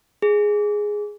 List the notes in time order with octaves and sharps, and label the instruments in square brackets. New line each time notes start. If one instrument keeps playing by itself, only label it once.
[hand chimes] G#4